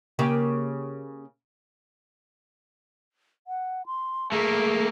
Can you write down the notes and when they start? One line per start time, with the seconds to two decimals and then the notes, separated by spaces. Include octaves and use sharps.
0.19 C#3 A#3 G4
3.47 F#5
3.86 C6
4.32 A3 A#3 G#4